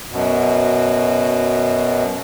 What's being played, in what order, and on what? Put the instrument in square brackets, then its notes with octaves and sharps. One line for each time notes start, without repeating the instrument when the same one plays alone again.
[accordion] F#2 B2